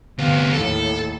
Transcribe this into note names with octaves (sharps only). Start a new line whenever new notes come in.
D2 C3 B3 F5
D#2 A2 A4